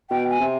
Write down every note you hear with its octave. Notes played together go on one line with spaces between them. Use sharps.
B2 G5
G#5
C3